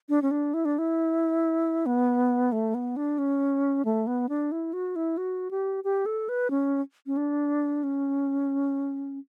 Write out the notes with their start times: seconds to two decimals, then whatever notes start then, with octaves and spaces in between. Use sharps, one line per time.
0.09 D4
0.22 C#4
0.31 D4
0.54 E4
0.65 D4
0.79 E4
1.86 B3
2.52 A3
2.74 B3
2.96 D4
3.18 C#4
3.85 A3
4.07 B3
4.29 D4
4.52 E4
4.73 F#4
4.96 E4
5.17 F#4
5.51 G4
5.84 G4
6.06 A4
6.29 B4
6.50 C#4
7.06 C#4
7.17 D4
7.83 C#4